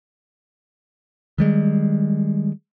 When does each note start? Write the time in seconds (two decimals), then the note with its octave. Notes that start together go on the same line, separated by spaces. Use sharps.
1.38 D#3 G3 G#3